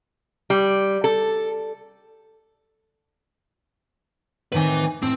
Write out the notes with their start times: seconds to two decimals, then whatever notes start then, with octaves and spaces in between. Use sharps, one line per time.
0.50 G3
1.04 A4
4.52 A2 D#3 C4 B4 G#5
5.02 A2 C4